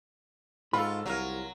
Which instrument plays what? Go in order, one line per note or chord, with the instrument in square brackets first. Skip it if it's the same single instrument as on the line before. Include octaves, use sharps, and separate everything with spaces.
[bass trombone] G#2 [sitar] F4 [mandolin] F#4 A4 [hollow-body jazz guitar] B5
[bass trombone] C2 [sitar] F#3 [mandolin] F4 A#4 C#5